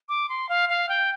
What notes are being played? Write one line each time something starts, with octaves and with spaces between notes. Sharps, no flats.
D6
C6
F5
F5
G5